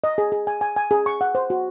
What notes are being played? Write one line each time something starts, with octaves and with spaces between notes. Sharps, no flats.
D#5
G#4
G#4
G#5
G#5
G#5
G#4
C#6
F#5
C5
F#4